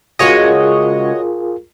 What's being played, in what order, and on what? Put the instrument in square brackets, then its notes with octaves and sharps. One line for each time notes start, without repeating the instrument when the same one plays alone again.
[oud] C#3 G#3 [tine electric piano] F4 G#4 A#4 [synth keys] F#4 C#5 D#5